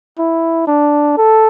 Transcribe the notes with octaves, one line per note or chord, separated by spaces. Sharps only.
E4
D4
A4